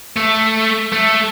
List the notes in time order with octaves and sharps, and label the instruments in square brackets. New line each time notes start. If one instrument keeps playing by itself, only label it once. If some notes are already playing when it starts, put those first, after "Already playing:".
[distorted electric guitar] A3
A3